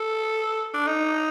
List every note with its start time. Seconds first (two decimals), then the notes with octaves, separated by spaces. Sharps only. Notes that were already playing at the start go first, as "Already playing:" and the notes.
Already playing: A4
0.74 D4
0.87 D#4